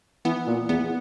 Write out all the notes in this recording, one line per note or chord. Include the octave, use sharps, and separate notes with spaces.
E3 B3
A#2
E2 B3